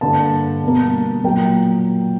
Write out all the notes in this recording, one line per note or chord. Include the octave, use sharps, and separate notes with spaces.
G2 D3 G3 A#3 A5
B2 G3 A#3
A#2 F#3 A#3 G5